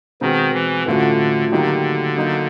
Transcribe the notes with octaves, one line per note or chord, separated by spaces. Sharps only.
B2 D#3 G#3 C4
E3
A2 D3 F3 A3 C#4 F#4
D3 D#3 F#3 A#3 D#4 G4
F#3 A#3 D#4